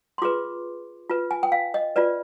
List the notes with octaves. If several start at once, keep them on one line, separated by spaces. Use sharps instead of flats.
C6
F4 G#4 B4 D6
F4 B4
G#5
G5
F5
D#5
F4 B4 D5